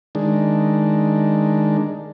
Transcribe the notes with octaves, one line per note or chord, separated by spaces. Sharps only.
D#3 G#3 D4